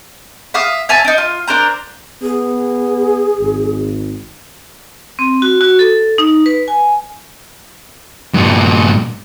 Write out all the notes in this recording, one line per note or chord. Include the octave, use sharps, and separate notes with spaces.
E5 F5 D#6
C#5 E5 G#5 A5
D4 D#4
F4
D4 A#4 C5 A#5
B3 G#4
G#1
C4
F#4
F#4
A4
D#4
B4
G#5
G2 A#2